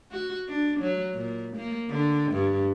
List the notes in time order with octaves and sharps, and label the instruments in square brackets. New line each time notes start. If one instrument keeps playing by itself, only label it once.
[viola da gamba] F#4
D4
F#3
A#2
A#3
D3
G2